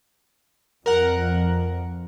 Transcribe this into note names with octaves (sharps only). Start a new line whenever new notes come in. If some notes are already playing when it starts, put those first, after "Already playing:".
F2 A#4 F#5